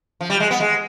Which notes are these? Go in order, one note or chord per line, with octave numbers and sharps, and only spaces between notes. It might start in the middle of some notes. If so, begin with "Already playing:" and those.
F3
G3
G#3
B3
G#3